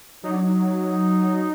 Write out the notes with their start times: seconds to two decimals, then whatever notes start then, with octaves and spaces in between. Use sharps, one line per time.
0.24 F#3 D#4
0.33 D4
0.42 D#4